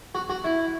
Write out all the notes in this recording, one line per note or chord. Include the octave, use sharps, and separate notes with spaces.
F#4
F#4
E4